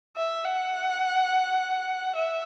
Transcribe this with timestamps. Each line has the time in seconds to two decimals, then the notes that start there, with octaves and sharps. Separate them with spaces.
0.16 E5
0.45 F#5
2.15 E5